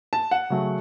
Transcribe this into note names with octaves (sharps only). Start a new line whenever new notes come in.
A5
F#5
C#3 F#3 A3